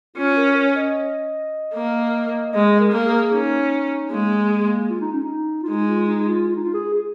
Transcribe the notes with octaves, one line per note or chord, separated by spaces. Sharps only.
C#4 F4
A#4
C#5
D#5
A#3
G#3 D#5
A#4
A#3
G#4
C#4 D#4
G#3 A#3
A#3
A#3
F4
D#4
C#4
D#4
F4
G#3 D#4
F4
D#4
F4
F4
D#4
F4
G#4
G#4